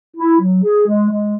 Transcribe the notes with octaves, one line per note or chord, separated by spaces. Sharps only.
E4
F#3
G#4
G#3
G#3